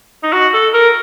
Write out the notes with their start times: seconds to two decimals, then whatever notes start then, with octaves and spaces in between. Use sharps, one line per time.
0.23 D#4
0.32 F#4
0.53 A4
0.74 A#4